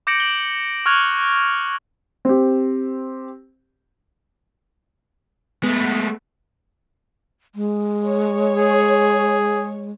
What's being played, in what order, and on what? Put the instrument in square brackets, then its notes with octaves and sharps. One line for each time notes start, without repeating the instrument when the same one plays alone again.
[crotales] D6 G6 A#6 C#7 D7 F#7
D7 F#7 G7
C#6 F6 F#6 G#6 F7 F#7
[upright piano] C4 G4
[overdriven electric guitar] G#3 A3 [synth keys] B3
[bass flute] G#3
[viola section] C#5
[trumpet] G#4